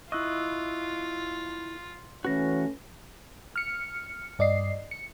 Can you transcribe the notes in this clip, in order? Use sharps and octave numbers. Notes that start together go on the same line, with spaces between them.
E4 F4 D#5 C#6 E6 F#6
E3 A3 C#4 F#4 B4 A#6
F6 C#7
G2 D5 D#5 C7
C#7